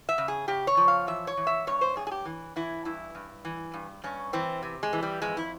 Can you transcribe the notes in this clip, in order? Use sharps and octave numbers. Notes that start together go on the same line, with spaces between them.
E5
C#3
G#4
C#3 G4
C#5
F3
F5
E3 E5
C#5
E3
E5
G2 C#5
C5
G2 G#4
G#4
G4
E3
E3 E4
G2 E4
G2
E3
G2
G2 C#4
E3 C4
C3
G#3
E3
G3
F2 G#3
E4